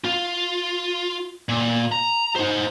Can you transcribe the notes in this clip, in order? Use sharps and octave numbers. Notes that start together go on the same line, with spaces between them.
F4
A#2
A#5
D#4 C5